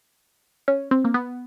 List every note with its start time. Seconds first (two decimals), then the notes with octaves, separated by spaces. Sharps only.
0.68 C#4
0.91 C4
1.05 A#3
1.14 B3